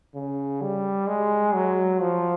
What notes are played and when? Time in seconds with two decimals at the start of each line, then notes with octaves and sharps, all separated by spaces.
0.15 C#3
0.62 G3
1.07 G#3
1.54 F#3
2.01 F3